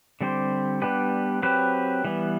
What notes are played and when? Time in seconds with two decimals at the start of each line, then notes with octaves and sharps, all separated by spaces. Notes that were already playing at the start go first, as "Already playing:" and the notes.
0.21 D3 G3 C4 G4 C5
0.82 G3 B3 D4 G4 B4
1.42 F#3 C4 G4 B4
2.05 E3 G3 B3